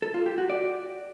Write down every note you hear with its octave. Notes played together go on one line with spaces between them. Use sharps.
A4
F4
G4
F#4
D5